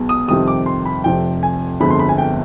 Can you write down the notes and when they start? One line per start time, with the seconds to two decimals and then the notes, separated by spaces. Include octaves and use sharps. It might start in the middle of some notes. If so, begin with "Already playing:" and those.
Already playing: B1 B2 G#3 B3
0.09 D#6
0.28 F2 C3 D#3 G3 D#6
0.48 D6
0.66 C6
0.86 B5
1.04 F1 F2 C3 G5
1.43 G#5
1.80 G1 F2 D3 G#3 B3 B5
1.90 C6
1.99 B5
2.09 G#5
2.18 G5